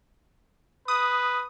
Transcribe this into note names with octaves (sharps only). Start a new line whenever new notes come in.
B4 D#6